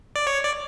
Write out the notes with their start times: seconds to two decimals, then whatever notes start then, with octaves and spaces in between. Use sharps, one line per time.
0.16 D5
0.27 C#5
0.44 D5